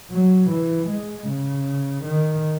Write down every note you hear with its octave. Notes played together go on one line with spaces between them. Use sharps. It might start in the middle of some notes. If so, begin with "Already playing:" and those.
F#3
E3
G#3
C#3
D#3